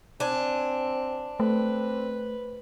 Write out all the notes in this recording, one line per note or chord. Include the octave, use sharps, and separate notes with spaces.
C4 D4 G#5
A3 C4 B4